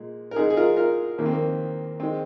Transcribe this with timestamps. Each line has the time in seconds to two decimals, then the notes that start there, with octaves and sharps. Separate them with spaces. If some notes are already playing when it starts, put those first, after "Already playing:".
Already playing: A#2 G#3
0.31 A#4
0.36 G#2 G#3 D#4 G#4
0.50 G#4
0.57 F4 A#4
0.77 F4 A#4
1.18 D#2 D#3 A#3
1.26 C4
1.33 A#3
2.00 D#3 G#3 C4